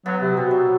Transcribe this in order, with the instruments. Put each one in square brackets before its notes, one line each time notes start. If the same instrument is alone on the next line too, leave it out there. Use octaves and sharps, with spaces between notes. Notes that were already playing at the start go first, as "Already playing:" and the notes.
[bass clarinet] F#3 [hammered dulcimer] B3
[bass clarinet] C3
[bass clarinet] B2 [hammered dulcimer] C4
[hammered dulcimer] F#3